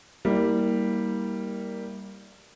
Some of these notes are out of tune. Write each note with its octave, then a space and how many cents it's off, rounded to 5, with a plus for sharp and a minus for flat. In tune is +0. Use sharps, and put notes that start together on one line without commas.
G3 +0 A#3 +0 E4 -40